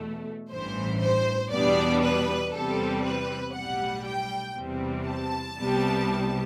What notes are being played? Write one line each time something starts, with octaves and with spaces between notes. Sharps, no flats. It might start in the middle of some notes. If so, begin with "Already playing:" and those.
Already playing: E2 B2 A3
A1 G2 E3 C5
C5
E2 B2 G3 B3 D4 D5
B4
E2 C3 G3 C4 A4
B4
B1 A2 G3 F#5
G5
E2 C3 G3 C4
A5
C2 C3 G3 B3